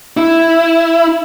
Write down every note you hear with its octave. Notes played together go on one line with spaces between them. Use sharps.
E4